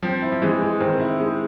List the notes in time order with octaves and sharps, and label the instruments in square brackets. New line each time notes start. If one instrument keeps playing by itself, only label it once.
[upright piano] F3 [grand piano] C4
[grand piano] E4
[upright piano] F3
[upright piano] E3 [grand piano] G#3
[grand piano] G#3
[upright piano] D#3 [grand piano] C4
[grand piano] E4
G#3